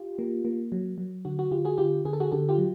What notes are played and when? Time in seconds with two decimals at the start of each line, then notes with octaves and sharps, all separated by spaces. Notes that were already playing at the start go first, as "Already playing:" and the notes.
Already playing: F4 G4
0.19 A#3
0.45 A#3
0.72 F#3
0.98 F#3
1.25 D3 F#4
1.39 F#4
1.51 D3 F4 G4
1.65 F#4 G#4
1.78 D3 F4 G4
2.05 D3 G#4
2.13 A4
2.20 F#4 G#4
2.31 D3 G4 A4
2.49 F4 G4
2.58 F#3